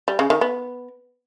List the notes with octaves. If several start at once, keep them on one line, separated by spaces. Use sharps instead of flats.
G3
C#3
D#3
B3